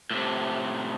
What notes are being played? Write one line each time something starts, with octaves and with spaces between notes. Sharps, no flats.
A2 C3